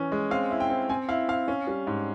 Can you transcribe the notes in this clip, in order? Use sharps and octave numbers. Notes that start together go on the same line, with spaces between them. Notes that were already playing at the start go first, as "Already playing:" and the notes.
Already playing: E3 C#4
G#3
C4 F5
E4
G5
C4
C4 G#5
E4 F5
C4 F5
C#4
G3
G#2